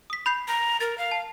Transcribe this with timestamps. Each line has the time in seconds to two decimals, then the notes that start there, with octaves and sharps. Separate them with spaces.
0.10 D#6 B6
0.26 B5 G6 C7
0.48 A#5
0.80 A#4 A6
0.98 F5
1.11 A5